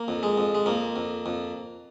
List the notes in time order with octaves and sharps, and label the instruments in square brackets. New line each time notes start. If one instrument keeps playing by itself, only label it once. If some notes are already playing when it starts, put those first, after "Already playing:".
Already playing: [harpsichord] A#3
F2
G#3
F2
G#3
F2 A#3
F2
F2